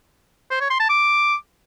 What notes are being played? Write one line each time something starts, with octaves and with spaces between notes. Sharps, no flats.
C5
C#5
C6
A5
D6